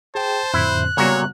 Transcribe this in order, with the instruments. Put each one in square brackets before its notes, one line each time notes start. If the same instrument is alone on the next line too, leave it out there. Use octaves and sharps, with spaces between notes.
[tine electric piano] G#4 G5 [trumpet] C5 [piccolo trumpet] A5
[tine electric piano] F2 A2 D3 [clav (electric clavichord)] E4 [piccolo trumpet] F#6
[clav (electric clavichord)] A#2 F#3 F#4 [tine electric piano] C#3 G3 B3 [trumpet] C#5